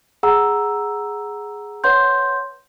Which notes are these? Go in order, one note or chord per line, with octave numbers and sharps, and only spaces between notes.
G#4 F#5 A#5 E6
B4 C#5 F#5 C6 G6